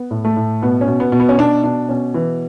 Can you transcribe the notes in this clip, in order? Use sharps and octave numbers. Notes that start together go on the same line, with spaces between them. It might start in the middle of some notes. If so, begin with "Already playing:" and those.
Already playing: B3
A2
A3
A2
B2 B3
C#4
B2
B3
B2
B3
C#4
B2 D4
B2 D4
B2 C#4
E3